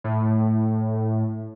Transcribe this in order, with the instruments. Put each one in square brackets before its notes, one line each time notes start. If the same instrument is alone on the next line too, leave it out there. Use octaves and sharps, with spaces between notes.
[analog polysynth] A2